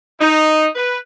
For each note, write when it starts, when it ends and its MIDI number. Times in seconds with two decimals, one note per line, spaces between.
0.19 0.67 63
0.74 0.96 71